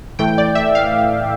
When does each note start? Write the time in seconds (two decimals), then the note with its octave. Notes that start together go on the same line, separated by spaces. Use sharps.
0.19 A2 E3 A3 G5
0.38 D5
0.55 E5
0.75 F5